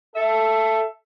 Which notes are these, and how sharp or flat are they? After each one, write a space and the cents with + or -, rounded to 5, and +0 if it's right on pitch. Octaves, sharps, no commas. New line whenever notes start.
A4 +0 E5 +20